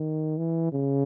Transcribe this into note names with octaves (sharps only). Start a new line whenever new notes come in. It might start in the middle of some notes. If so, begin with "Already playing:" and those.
Already playing: D#3
E3
C#3